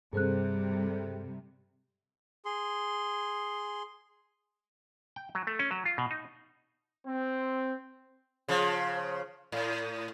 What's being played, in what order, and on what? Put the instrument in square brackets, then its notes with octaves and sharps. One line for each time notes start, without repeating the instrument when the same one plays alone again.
[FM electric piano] G2 A4 [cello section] C3 G3 [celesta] G#4 C5 F#6
[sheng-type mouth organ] G#4 C6
[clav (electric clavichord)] G5
F#3
A3
C#4
F#3
F4
B2
D#4
[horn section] C4
[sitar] C#3 F3
A2